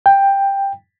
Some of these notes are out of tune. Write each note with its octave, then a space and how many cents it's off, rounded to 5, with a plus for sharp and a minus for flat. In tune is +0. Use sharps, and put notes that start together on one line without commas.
G5 +10